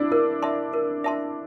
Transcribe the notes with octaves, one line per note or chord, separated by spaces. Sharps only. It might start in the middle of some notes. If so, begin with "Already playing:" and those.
Already playing: D4 E4
E4 A#4
E5 A5 C6
A#4
E5 A5 C6